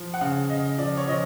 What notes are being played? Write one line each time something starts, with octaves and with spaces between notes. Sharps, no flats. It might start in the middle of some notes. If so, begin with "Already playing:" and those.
Already playing: F3
F#5
C#3 F5
C#3 D#5
F3 D5
C#5
F3 D#5